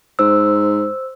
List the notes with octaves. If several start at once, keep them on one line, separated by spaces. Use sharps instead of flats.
G#2 C5 E6